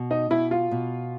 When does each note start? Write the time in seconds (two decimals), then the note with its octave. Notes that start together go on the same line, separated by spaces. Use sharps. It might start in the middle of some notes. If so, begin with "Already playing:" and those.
Already playing: B2
0.11 D#4
0.30 B2 E4
0.51 F4
0.71 B2